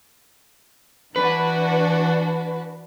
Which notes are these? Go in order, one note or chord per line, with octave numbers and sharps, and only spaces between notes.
E3 D4 F#4 B4